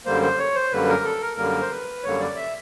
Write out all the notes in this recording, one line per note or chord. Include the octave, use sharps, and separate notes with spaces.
F#2 D3 G3 A#3 C5
C5
C#5
C5
F#2 D3 G3 A#3 B4
A#4
A4
A#4
F#2 D3 G3 A#3 A#4
C5
B4
F#2 D3 G3 A#3 C#5
D5
E5